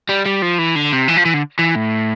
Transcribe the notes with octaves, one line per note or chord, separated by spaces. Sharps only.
G3
G3
F3
E3
D3
C3
E3
F3
E3
D3
E3
A2